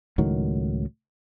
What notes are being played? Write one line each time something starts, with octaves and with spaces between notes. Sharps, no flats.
C#2 A2 D#3 F#3